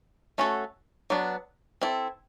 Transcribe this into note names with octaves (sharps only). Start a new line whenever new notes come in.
A3 C#4 F#4 A4
F#3 B3 D4
C4 E4 A4